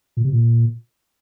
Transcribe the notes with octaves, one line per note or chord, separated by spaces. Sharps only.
A#2
C3
A#2